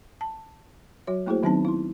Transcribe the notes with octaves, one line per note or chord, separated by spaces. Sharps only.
A5
F#3 F#4 C#5
A3 A#3 E4 F#4 G#4 C5
D#3 F#3 B3 C4 D#4 A5
E4 C6